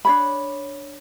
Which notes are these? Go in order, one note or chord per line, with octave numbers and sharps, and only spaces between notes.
D4 C#5 B5